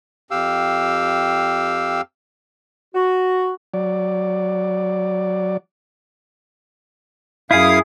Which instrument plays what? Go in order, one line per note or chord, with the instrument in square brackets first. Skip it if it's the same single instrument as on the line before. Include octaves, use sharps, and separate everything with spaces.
[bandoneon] F2 G4 F5 E6
[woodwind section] F#4
[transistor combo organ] F#3 D5
[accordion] F#2 F5 D#6 [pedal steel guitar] E4 G#4